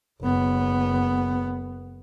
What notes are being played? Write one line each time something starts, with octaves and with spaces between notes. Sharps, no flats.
F#1 B3